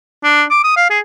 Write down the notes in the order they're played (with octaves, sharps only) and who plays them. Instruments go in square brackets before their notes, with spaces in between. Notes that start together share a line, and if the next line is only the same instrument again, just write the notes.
[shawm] D4
D6
D#6
F5
G#4